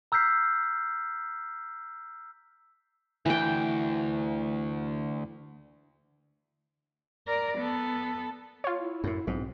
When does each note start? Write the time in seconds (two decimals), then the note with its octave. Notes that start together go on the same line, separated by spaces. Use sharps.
0.12 A#5 E6 F6 G6 B6 C7
3.26 D2 E3 G5
7.28 A#4 D5
7.58 B3 A4
8.64 F4 C#5
8.79 E4
9.04 F#2 A2
9.27 B1 G#2 C4